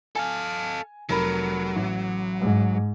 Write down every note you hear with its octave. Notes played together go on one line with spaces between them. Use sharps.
A4 F5 G#5
F1 F#3 A#4 B5
A1
G#2